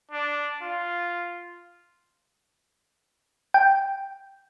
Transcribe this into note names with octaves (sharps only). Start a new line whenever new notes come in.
D4
F4
G5